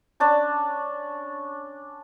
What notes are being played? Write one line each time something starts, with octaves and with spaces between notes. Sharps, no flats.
C#4 D4 A5 B5